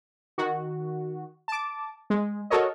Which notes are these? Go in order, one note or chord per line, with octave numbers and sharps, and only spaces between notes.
D#3 F#4
A5 D6
G#3
F#4 A4 A#4 C#5 D#5